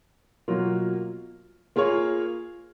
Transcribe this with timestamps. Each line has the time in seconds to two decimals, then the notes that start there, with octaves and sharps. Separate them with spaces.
0.48 B2 F#3 A#3 F4
1.76 A#3 F4 G#4 C#5